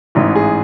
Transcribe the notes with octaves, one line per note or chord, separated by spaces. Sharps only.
A1 G#2 E3
G#4